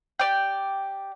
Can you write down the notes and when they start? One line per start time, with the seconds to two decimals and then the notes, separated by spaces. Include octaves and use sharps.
0.19 G4 D5 G5